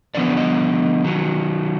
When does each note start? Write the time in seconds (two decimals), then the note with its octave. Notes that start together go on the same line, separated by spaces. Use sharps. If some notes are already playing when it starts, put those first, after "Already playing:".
0.15 D3 F3 B3 D5
0.37 D#5
1.04 D#3 F#3